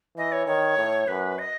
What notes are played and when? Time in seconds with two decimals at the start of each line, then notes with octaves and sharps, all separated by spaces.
0.16 E3 D#5
0.32 C#5
0.46 D#3 C#5
0.77 A2
1.07 F#2 B4
1.38 D#5